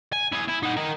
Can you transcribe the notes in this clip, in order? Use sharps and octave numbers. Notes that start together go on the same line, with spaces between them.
G#5
E4 G#4
E4
D#4 F#5
A#4 D#5